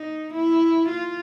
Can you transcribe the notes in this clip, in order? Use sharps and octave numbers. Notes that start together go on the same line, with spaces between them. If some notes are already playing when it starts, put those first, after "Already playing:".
Already playing: D#4
E4
F4